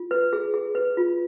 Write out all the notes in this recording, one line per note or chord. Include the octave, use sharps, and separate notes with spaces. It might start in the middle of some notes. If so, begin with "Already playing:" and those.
Already playing: F4
B4
G#4
G#4
B4
F4